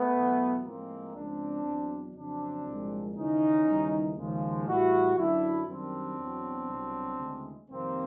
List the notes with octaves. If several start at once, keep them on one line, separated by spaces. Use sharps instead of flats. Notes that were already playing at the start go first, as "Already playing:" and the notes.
Already playing: A3 B3
E2 B2 F#3
A2 F3 G#3 A#3 C4
C#2 C#3 F3 C4 D4
E2 B2 F#3
F2 C#3 F#3 C4 D4
C2 A#2 F3 G#3
D#2 C#3 E3 C#4 D#4
D#2 C#3 E3 G3
D#2 C#3 F3 G#3
A2 E3 G3 E4 F#4
F#2 D3 F#3 D4 E4
F#2 D#3 G3 C4 D4
E2 B2 F#3
C2 B2 F#3
D2 C#3 E3 G#3
F2 C3 D#3 G3 A#3 C4